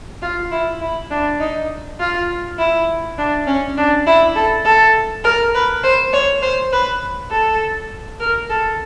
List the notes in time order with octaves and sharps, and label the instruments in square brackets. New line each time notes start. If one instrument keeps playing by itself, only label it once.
[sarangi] F4
E4
E4
D4
D#4
F4
E4
D4
C#4
D4
E4
A4
A4
A#4
B4
C5
C#5
C5
B4
A4
A#4
A4